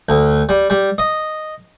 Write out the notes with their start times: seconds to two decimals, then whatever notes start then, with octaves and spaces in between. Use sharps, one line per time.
0.09 D2
0.49 G3
0.70 G3
0.98 D#5